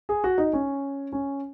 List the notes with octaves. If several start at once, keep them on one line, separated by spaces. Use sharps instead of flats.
G#4
F#4
D#4
C#4
C#4